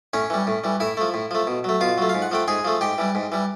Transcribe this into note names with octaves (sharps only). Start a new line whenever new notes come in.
A2 C#4 C#5
E3 G3
A2
E3 G3
A2 E4 E5
F3 A3
A2
F3 A3
B2
F#3 A3
B2 F4 F5
F#3 A3
F5
G#2
F#5
F3 A3 G5
G#2 G#4 G#5
F3 A3
G#2 G4 G5
E3 G3
G#2
E3 G3